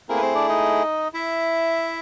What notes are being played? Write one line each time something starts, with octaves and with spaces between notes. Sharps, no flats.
A3 A#3 C4 E4 G#4 A#4
B4
C4 C5
D4 D5
D#4 D#5
E4 E5